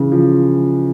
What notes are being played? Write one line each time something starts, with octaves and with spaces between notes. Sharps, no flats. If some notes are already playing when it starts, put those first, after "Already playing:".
Already playing: C#3 E3
F3